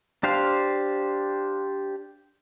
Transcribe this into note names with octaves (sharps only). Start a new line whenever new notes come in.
D4 G4 C5 F5